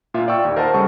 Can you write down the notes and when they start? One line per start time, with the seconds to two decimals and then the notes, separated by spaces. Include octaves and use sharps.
0.14 A#2 F4 E5
0.28 D5 F5 G5 C#6 E6
0.45 D#2
0.56 A#4 C5 D#5 F#5 A5
0.74 C#3 G3 A4 C#6